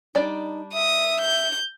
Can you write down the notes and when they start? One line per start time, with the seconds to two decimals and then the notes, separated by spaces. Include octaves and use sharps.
0.15 G3 D4 D#4 D5
0.73 E5 D#6
1.21 G6